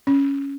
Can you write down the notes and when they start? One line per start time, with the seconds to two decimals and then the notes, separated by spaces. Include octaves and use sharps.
0.07 C#4